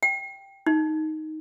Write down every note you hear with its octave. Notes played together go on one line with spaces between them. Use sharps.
G5
D#4